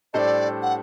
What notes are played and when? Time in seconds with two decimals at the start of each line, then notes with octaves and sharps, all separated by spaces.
0.14 A2 G3 D4 A4 C5 D5 D#5
0.62 F#5